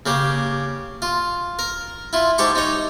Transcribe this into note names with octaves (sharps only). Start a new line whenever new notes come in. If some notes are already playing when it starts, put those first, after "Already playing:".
C#3 A#3 G4
F4
A#4
E4 F4
G#2 G4 A5 C#6 D6
D#4 C#5